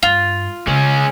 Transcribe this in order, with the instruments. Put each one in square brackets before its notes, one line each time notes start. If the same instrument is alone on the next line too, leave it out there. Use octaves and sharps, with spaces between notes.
[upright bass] G2 [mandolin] F4
[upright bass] C#3 [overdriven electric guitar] G#3 C#4